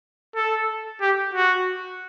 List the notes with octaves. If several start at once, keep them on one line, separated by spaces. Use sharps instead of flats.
A4
G4
F#4